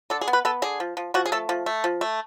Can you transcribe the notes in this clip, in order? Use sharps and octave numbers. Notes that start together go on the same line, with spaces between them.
D3 A4
G#4
B3
B4
B3 A4
D3 G#4
F3
F3
F3 F#4
G#4
A3 A4
F3
A3
F3
A3